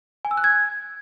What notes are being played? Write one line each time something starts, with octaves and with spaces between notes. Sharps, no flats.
G#5
E6
F#6
G#6